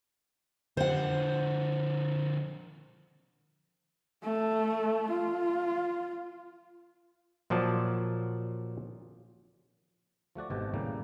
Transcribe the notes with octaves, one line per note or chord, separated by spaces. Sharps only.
D3 F3 C5 F#5
A3
F4
A#2 F3 F#3 D5 A5
F3 A3 F#4 D5
G#1 B2 C4 G4 A5
A2 C#3 G3 A#3 G4